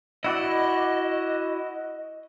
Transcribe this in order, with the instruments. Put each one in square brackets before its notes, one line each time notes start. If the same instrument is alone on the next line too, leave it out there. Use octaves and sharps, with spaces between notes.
[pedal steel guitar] E4 F#4 D5 [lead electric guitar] D#5